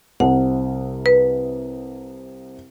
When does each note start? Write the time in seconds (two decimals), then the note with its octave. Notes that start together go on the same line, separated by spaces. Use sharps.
0.20 C2 C3 F#5
1.06 B4